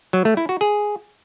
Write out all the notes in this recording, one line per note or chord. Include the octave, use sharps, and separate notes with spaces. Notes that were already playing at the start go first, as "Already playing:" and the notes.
F#3
A3
E4
F#4
G#4